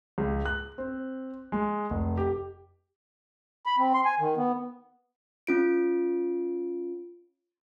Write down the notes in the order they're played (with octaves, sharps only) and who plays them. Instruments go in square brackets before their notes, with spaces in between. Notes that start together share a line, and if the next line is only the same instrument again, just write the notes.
[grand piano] C#2
F#6
C4
G#3
F1
G4
[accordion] B5
C4
C6
G#5
D#3
B3
[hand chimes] C#4 F4 D7